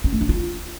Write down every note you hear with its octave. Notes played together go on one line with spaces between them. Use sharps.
C#4
A3
D4
F4